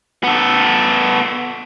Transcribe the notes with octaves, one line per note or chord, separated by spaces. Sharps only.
B3 A4